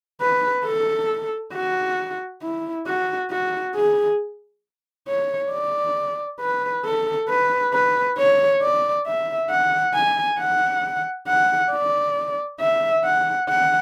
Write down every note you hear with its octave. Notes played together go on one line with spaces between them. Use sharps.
B4
A4
F#4
E4
F#4
F#4
G#4
C#5
D5
B4
A4
B4
B4
C#5
D5
E5
F#5
G#5
F#5
F#5
D5
E5
F#5
F#5